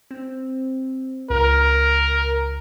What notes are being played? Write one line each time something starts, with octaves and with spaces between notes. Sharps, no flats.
C4
C#2 A#4